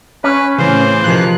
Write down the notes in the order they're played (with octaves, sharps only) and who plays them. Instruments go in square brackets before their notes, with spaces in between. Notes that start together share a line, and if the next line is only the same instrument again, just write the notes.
[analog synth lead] C#4 [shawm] B4
[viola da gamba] A2 C4 [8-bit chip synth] C#3 E3 [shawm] C5
[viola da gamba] C3 D#3 F3 [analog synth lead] F#6